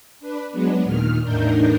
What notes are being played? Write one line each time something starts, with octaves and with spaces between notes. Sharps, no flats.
D4 B4
F#3 G#3 B3 D4
D#2 A#2 D#3 F6
E2 A2 D4 D#4 A#4 G6